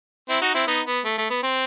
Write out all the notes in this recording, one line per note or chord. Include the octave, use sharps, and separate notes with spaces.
C4 E4
D#4 F#4
C4 E4
B3 D#4
B3
A3
A3
B3
C4